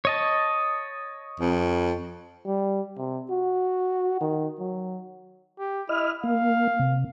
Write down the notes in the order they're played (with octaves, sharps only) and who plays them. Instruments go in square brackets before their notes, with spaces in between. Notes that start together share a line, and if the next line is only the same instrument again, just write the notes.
[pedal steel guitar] C#5 D#5 A5
[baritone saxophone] F2
[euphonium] G3
C3
F#4
D#3
F#3
[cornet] G4
[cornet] E4 [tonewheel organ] D#5 F6
[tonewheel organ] A#3 [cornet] F5
[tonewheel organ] C3